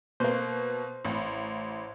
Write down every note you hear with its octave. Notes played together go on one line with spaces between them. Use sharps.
B2 A#3 C5
A1